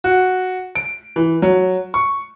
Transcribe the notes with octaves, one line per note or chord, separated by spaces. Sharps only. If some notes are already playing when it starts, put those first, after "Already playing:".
F#4
D7
E3
F#3
C#6